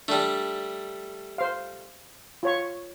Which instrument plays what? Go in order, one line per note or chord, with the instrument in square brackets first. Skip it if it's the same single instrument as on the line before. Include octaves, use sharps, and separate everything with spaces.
[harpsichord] G3 A3 [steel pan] D4
[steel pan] C5 F5
F4 C#5 C#6